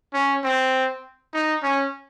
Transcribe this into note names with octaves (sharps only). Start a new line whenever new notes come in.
C#4
C4
D#4
C#4